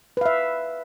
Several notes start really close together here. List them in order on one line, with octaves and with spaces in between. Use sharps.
B4 F5 E5